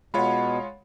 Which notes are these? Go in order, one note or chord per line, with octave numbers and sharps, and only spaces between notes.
B2 G#3 F4 C#5 F#5 B5